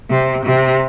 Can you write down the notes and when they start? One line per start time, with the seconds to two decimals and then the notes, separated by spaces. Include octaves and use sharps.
0.10 C3
0.46 C3